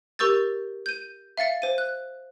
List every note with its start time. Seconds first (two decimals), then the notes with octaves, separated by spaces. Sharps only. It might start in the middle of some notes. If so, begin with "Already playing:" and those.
0.19 G4 A#4 C#6 E6 G6 A6
0.86 G6 D#7
1.37 E5 F5 A6 C#7
1.62 C5 D#7
1.78 F#6